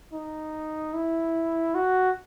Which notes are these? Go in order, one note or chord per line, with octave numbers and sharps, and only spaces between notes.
D#4
E4
F#4